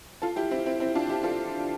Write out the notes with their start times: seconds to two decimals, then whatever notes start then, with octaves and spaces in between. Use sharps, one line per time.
0.22 F4 A4
0.36 E4 G4
0.51 C4 E4
0.66 C4 E4
0.80 C4 E4
0.95 D4 F4
1.10 E4 G4
1.23 F4 A4